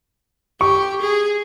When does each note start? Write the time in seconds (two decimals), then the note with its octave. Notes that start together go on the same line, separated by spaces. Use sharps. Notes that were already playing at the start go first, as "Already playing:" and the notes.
0.61 G4 C#6
1.01 G#4